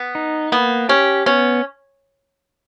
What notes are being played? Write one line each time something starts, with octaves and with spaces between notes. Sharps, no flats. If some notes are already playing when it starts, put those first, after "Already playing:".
Already playing: B3
D#4
A#3 B3
C#4 G4
B3 C#4